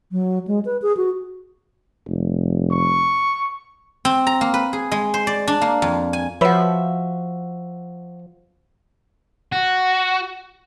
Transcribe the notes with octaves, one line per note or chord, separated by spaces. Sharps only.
F#3
G#3
B4
G#4
F#4
F1
C#6
C4
A#5
A#3
B4
G#4
G#3
C5
D5
D4
A#3
F2
G#5
F3 F#4 B4 C#5 E5 B5
F#4